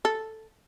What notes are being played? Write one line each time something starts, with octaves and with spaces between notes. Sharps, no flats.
A4